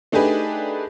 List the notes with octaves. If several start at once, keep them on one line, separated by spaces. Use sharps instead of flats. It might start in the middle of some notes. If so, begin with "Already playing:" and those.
A3 D4 D#4 G4 G#4 B4